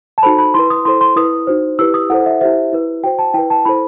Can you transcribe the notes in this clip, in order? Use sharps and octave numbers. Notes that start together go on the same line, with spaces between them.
A5
D#4 F#4 A4 C5 B5
B5
E4 B4 C6
D#6
E4 A4 C5 C6
C6
E4 B4 D#6
D#4 F#4 C5
E4 G4 B4 E6
D#6
E4 A4 C5 F#5
E5
E4 G4 C5 E5
E4 B4
F#4 C5 G5
A5
E4 B4 G5
A5
E4 A4 C5 B5